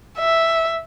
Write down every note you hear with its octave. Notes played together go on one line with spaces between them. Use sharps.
E5